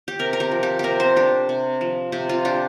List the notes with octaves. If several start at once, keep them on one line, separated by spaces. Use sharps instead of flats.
G4
C3 A#4
A#4
G4
F3
G4
C3 G4 A#4
C5
D4 G4
C3
F3
C3 G4
F4
D4 G4